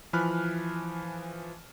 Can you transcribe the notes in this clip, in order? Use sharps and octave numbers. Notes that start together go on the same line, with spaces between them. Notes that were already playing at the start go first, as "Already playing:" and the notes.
E3 F3 G#5 B5 F6 F#6